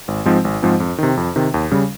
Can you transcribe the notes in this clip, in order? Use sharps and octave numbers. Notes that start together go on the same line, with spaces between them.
G#1
G#2 F3 G#3 C4
G#1
G#2 F3 G#3 C4
F2
C3 D#3
F2
C3 D#3
D#2
C#3 G3 C#4